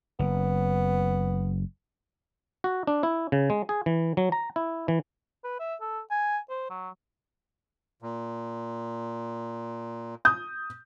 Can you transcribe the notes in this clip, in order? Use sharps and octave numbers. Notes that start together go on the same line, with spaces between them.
F#1 B3
F#4
D4
E4
C#3
G#3
G#4
E3
F#3
A#5
E4
E3
B4
E5
A4
G#5
C5
F#3
A#2
D#6 G6